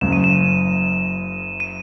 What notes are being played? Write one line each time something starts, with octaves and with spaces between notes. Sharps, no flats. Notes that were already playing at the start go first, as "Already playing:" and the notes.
F#1 F#2 C#3 E7
D#7
E7
D#7